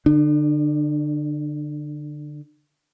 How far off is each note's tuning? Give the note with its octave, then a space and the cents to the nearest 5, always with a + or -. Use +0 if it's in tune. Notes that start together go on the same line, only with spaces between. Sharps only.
D3 +0 D4 +40